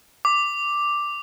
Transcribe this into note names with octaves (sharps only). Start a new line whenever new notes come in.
D6